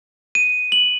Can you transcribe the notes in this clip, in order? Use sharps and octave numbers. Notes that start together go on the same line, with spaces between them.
D#7
F#7